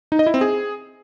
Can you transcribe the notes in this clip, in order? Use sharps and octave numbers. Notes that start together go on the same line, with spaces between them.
D#4
D#5
E4
C4
G#4